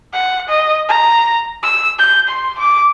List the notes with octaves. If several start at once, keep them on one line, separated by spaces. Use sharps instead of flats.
F#5
D#5
A#5
E6
G6
C6
D6